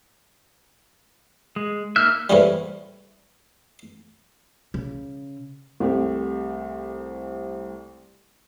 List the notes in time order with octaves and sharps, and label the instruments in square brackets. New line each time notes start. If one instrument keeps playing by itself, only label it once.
[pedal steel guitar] G#3
[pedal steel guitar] A#3 D#4 E5 [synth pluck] F6
[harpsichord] A2 C3 E3 G3
[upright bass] C#3
[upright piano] C2 A3 C4 G4